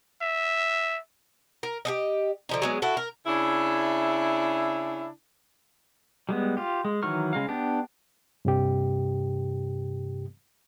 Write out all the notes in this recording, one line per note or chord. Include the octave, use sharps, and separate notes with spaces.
E5
A#4
G4 A4 D#5
D3 F3 D#4
F#3 G#3 B3
E4 F#4 A4
A#4
C#3 D4 E4
G3 G#3 B3
F4 G4
G#3
D#3 E3 F#3 C#6 F6
C#3 G#3 F5
B3 D4 G4
G2 C3 G4